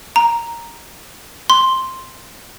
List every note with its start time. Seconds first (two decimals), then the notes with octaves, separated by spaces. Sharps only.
0.16 A#5
1.50 C6